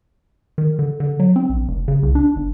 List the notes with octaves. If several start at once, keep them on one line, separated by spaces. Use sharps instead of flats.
D#3
D3
D3
F#3
C4
A#1
F1
C#3
C2
D4
G1